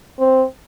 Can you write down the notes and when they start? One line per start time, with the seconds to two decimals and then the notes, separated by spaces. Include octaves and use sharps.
0.19 C4